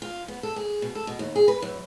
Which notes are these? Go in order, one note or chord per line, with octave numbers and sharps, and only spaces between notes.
F4
B3
A4
G#4
B2
A4
B2
D#2
G#4
B4
F#2